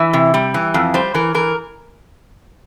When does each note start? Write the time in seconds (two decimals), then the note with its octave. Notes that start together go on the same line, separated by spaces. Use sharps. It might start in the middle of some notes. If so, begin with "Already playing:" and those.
Already playing: E3 E5
0.13 C3
0.34 G3
0.54 E3
0.74 F2
0.94 G3 C5
1.14 E3 A#4
1.34 E3 A#4